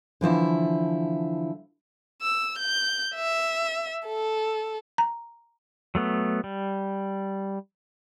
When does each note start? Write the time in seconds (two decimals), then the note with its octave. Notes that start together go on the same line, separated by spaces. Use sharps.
0.21 D3 E3 F3 E4
2.22 E6
2.58 G6
3.15 E5
4.07 A4
4.98 A#5
5.95 F#3 A3 B3
6.44 G3